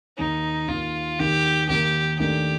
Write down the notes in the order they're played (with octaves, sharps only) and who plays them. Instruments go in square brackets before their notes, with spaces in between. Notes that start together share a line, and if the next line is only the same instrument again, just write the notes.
[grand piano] D#2 D#3 A#3 [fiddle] D#4
[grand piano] D#2 D#3 A#3 [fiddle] F4
[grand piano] D#2 D#3 A#3 [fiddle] G4
[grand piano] D#2 D#3 A#3 [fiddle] G4
[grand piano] D#2 D#3 A3 D4 [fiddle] G4